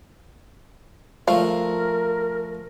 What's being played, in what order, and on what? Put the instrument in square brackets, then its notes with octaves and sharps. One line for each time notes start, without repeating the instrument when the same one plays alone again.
[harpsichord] F3 A3 [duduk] A#4 [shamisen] F5